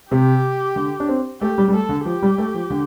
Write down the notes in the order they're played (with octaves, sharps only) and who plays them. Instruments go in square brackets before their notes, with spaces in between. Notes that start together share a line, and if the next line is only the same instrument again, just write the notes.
[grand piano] C3 [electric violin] G4
[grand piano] D3
D4
C4
[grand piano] A3 [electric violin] G4
[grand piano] G3
G3
[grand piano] A3 [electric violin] A4
[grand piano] D3
[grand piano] F3 [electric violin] G4
[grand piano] G3
A3
F3
D3